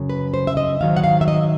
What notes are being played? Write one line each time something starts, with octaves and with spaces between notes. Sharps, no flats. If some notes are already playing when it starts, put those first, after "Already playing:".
Already playing: F#2 C#3
B4
C5
E5
D#5
G#2 D#3 F#3 F5
F#5
F5
E5
D#5